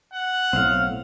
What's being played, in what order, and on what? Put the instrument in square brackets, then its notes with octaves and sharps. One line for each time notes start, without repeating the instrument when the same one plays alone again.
[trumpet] F#5
[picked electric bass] B1 A2 [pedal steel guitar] C4 F5